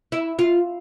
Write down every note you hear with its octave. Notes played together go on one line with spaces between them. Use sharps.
E4
F4